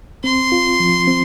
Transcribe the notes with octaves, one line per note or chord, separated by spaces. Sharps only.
C4 C6
F4
F3
C4